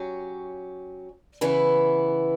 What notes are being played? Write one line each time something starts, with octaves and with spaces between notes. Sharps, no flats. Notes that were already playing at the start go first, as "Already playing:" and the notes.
Already playing: F#3 C#4 G4
C#3 E3 B3 E4